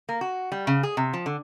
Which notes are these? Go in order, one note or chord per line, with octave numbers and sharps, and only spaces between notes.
A#3
F#4
G3
C#3
G#4
C3
F3
D3